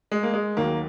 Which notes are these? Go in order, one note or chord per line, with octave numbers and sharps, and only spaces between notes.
G#3
A#3
G#3
D#2 D#3 F#3 A#3